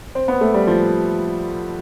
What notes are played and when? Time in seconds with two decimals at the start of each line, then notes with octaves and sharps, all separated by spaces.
0.15 C4
0.28 B3
0.41 A3
0.54 G3
0.67 F3